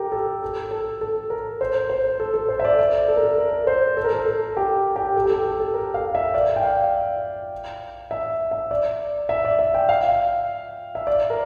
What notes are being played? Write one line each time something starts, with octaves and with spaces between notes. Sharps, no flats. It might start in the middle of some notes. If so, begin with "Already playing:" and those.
Already playing: G4 A4 A#4
A4
A4
A4
A4
A#4
C5
C5
A4
A4
C5
E5
D5
D5
A4
A#4
A4
A#4
C5
A4
A#4
A4
A4
G4
G4
A4
G4
A4
A4
A4
A#4
F5
E5
D5
G5
F5
E5
E5
D5
E5
D5
E5
G5
F5
E5
D5
A#4